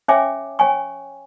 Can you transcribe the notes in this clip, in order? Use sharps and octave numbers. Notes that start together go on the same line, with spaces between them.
C#4 C#5 E5 G5 G#5 D6
C#5 G5 G#5 C#6